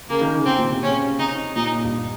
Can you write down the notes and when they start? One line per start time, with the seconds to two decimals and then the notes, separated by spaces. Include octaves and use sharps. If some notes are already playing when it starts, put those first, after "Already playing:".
0.09 C#3 A#3
0.21 D#3
0.34 C#3
0.45 C3 C4
0.58 A#2
0.70 C3
0.82 C#3 C#4
1.18 C3 D#4
1.56 A#2 D#4
1.85 G2